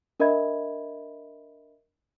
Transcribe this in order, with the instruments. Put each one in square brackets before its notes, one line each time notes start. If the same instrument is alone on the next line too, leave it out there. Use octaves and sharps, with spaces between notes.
[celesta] D4 A#4 D#5 E5 B5 G#6